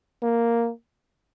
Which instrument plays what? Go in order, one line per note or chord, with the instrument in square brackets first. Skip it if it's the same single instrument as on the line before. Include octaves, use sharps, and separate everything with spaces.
[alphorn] A#3